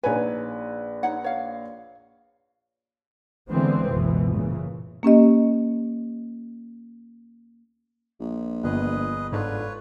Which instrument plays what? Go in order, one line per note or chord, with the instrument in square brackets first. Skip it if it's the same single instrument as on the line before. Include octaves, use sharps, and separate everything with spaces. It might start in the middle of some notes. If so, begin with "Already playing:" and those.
[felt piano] A#1 B4 [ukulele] D#4 C#5 G#5
[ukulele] D#4 C#5 F#5
C#5 F5
[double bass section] D3 E3 G#3 B3 C4
F#1 C#2 B2 E3
A#2 C#3 E3
[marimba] A#3 C#4 G4 D#5
[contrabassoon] A#1
[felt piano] G1 [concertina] G#4 B4 D#5
[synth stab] G#2 [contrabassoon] D3 [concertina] F4 B4 C#5